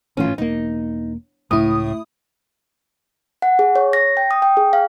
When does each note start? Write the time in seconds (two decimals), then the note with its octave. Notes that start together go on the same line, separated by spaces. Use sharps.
0.17 G#1 A2 E3 C#4 F4
0.38 E1 A#3 D#4
1.51 C#2 A2 E4 D#6
3.42 F#5
3.59 G#4
3.76 C#5
3.93 A#6
4.17 G5
4.31 D#6
4.42 G5
4.57 G#4
4.73 F5